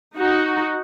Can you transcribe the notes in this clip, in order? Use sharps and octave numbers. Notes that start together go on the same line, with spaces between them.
D#4 F#4